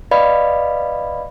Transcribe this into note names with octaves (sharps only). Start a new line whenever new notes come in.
B4 D5 D#5 F5 B5